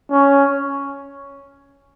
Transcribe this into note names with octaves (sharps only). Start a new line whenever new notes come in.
C#4